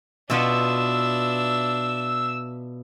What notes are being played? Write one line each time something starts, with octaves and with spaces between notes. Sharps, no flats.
B2 D4 F4 E5 F#5 E6